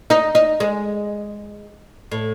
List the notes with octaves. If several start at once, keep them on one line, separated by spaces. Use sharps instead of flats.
D#4
D#4
G#3
A2